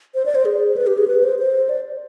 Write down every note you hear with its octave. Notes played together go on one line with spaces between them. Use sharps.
C5
D5
C5
G#4
B4
G4
G#4
B4
C5
C5
D5